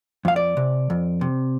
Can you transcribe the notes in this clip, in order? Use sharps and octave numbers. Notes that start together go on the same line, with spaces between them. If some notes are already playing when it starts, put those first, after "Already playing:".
F2 F5
D5
C3
F2
C3